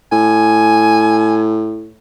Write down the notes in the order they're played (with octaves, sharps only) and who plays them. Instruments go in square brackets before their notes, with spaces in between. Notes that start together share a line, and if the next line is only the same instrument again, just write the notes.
[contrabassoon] A2 [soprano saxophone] G#5